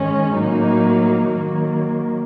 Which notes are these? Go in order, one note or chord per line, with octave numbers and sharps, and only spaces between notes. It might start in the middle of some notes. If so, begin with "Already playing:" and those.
Already playing: G#2 D#3 G#3 C#4
A2 F#3 A#3 D#4
D#3 F#3 A#3